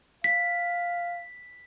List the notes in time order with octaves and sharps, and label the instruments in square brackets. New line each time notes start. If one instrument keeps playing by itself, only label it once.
[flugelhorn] F5 [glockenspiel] B6